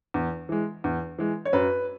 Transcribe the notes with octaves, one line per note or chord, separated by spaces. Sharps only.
E2
E3 G#3
E2
E3 G#3
C#5
F#2 B4